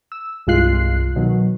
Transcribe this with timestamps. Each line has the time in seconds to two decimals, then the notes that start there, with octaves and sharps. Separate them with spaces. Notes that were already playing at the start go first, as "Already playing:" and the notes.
0.12 E6
0.47 C2 G2 G#3 F4 F#6 C7
1.16 B2 D#3 F#3